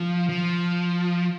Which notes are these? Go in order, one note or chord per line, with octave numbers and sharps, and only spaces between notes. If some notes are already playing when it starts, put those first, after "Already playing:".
Already playing: F3
F3